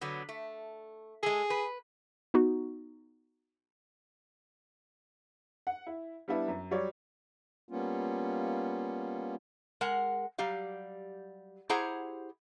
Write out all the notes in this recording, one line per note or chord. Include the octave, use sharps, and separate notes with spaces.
D3 F#3 B3
A3
G#3 G#4 A4
B4
B3 D#4 F#4
F#5
E4
G3 B3 D4 E4
F#2
F#3 G3 C#5 D5
G3 A#3 B3 C#4 F4
G#3 A#4 F#5
F#3 G3 G4 F5
E4 G4 G#4 C5 F#5 A#5